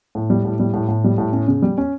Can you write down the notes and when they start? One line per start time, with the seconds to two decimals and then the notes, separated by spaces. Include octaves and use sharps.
0.15 A2
0.30 G3
0.45 A2
0.59 G3
0.74 A2
0.88 A2
1.04 G3
1.18 A2
1.33 C#4
1.48 C#3
1.62 G3
1.78 C#4